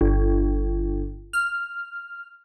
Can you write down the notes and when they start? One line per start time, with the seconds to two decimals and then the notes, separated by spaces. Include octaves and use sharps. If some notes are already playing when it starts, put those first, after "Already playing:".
0.01 G1
1.33 F6